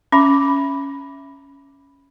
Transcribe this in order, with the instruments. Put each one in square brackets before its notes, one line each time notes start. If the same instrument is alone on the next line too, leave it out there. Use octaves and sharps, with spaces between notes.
[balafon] C#4 [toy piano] E5 B5 D6